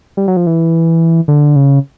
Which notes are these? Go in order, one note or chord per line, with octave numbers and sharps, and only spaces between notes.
G3
F#3
F3
E3
D3
C#3